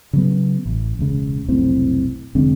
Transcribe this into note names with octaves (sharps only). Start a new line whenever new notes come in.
C#3 F#3 B3
A1
E1 C#2 C#3
F1 B1 A2 C4
F1 D3 G#3 C4